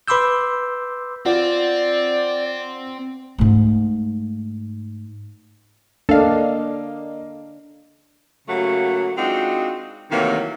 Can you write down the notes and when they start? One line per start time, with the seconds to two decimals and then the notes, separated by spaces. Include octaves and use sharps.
0.08 B4 B5 C6 D6 E6 G6
1.26 C4 F4 D5 F#5
3.38 G#2 A3
6.09 A#3 D4 A4 D#5 F5
8.48 C#3 F#3 A3 A#3 G4 F#5
9.18 G#3 C4 D4 D#4 F4 F#4
10.11 C3 D#3 E3 F#3 A3 A#3